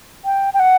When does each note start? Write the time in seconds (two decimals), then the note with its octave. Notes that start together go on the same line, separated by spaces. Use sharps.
0.24 G5
0.53 G5
0.59 F#5